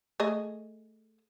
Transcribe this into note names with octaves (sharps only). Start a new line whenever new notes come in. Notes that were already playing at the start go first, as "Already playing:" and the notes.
A3 G#4 D#5